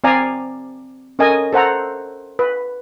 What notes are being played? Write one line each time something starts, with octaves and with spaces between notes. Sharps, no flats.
C4 D5 F5 G#5 A#5
C#4 A4 A#4 D#5 G#5
A4 C5 F#5 A#5
B4